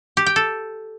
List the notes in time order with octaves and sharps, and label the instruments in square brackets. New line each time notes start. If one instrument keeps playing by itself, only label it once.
[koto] G4
G5
A4